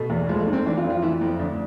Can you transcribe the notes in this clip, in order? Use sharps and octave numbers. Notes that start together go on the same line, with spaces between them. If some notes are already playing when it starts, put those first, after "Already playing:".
Already playing: B2 A3
E2
F3 G#3
A3
G#2
C4
E3 D4
F4
F2
F4
E3 E4
F2
D2 D4